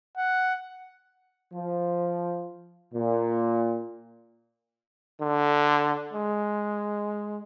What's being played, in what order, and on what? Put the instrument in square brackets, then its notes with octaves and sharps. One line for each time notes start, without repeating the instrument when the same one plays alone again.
[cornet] F#5
[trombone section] F3
A#2
[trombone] D3
G#3